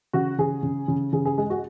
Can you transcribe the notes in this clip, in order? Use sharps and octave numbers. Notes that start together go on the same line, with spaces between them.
C#3 F#4
C#3 G#4
C#3
C#3
C#3 G#4
G#4
G#3 G#4
F#4